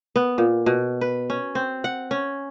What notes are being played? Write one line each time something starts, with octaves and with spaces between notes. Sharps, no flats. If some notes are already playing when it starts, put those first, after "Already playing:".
B3
A#2
B2
B4
C#4
C4
F#5
C#4